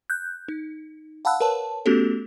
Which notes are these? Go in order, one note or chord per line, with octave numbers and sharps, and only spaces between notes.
F#6 G6
D#4
F5 F#5 A5 B5 E6 F#6
A#4 B4 C#5 A5
A3 B3 C#4 F#4 G4 A4